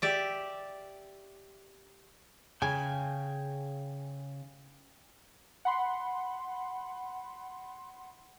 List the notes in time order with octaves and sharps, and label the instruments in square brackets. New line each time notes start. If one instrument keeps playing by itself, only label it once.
[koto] G4 D5 E5
[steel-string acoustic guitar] C#3 [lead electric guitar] G5 G#5
[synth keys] F#5 B5 C6